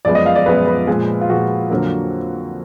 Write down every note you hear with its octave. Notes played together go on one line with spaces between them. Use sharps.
F#2 F3 G#3 B3 D5
D#5
F5
D5
F#2 F3 G#3 B3 B4
B4
A#2 F3 G#3
F4
A#2 F3 G#3 F#4
F2 D3 F#3 A#3